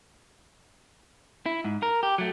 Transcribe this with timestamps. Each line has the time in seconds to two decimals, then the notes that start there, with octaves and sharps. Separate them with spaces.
1.46 E4
1.64 G#2
1.83 A#4
2.03 G4
2.18 F#3 A3